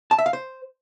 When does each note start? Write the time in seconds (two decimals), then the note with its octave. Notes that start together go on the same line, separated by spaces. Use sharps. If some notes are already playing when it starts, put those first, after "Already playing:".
0.11 A5
0.18 E5
0.26 F5
0.33 C5